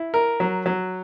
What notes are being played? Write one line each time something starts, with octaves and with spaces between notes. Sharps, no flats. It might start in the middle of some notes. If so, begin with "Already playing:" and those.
Already playing: E4
A#4
F#3
F#3